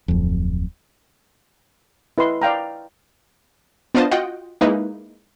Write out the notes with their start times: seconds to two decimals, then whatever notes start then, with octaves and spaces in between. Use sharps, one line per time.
0.08 D1 F2
2.18 E4 B4 D#5 C6
2.42 D5 F5 G5 A#5
3.95 B3 D4 F4 C5 D#5 A5
4.11 F4 F#4 D#5 F#5 G5
4.61 G#3 A#3 D#4 E4 B4